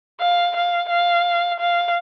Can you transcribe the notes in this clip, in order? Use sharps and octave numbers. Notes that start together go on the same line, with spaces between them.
F5
F5
F5
F5